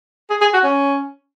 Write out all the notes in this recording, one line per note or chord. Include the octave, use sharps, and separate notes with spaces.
G#4
G#4
F#4
C#4